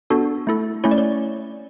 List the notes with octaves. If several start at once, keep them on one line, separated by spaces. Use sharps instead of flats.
B3 D4 F#4 A4
A3 E4 A4
A3 C#4 E4 C#5
D5
C#5